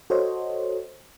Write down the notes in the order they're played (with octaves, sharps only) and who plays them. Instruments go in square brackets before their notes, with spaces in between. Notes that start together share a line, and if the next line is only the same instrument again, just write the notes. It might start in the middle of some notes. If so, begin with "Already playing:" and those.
[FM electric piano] F#4 A4 C5 C#5 D#5